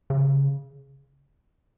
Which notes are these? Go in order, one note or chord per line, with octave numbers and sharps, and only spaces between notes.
C#3